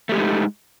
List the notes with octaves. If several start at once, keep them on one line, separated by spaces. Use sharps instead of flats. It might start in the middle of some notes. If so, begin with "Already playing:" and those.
G#3 A3 D4 D#4 G4